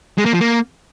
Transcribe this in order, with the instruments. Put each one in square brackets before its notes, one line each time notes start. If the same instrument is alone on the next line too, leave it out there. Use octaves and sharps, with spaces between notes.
[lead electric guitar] G#3
A#3
F3
A#3